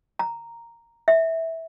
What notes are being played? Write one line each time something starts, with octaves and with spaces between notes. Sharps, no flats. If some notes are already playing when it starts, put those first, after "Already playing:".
A#5
E5